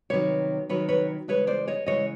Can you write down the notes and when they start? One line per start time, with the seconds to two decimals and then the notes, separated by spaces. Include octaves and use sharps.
0.10 C3 D#3 F#3 B4 C#5
0.69 C3 D#3 F#3 B4 C#5
0.89 B4 C#5
1.28 C#3 E3 G#3 B4 C#5
1.47 C5 D5
1.68 C#5 D#5
1.86 C#3 E3 G#3 C#5 D#5